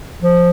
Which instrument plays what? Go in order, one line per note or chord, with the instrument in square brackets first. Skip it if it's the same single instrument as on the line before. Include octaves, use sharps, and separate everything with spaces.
[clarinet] F3